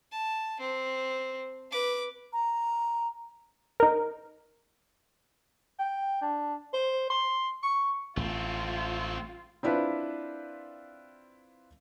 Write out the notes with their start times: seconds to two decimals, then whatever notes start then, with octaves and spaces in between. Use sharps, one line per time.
0.11 A5
0.60 C4
1.71 B4 D6
2.33 A#5
3.80 D#4 A#4
5.79 G5
6.22 D4
6.74 C5
7.10 C6
7.63 C#6
8.17 A1 A3 C4 F4
9.63 C4 D4 E4 F4 B4